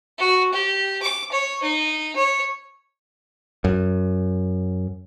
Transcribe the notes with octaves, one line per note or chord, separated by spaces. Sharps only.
F#4
G4
D6
C#5
D#4
C#5
F#2